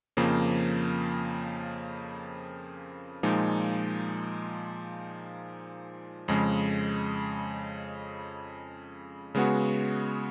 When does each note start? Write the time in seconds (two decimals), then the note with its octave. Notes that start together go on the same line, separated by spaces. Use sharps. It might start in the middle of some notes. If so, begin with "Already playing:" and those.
0.17 F2 C#3 F3 A#3
3.23 A#2 F3 G#3 D#4
6.28 F2 C#3 G#3
9.35 C#3 G#3 B3 F#4